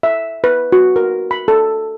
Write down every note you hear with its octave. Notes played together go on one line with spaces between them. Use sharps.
E5
B4
F#4
A#4
B5
A4